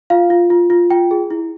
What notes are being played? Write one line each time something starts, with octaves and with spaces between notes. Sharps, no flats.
F4 F5
F4
F4
F4
F4 G5
G#4
E4